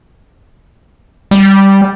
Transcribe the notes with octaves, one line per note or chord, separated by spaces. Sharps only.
G3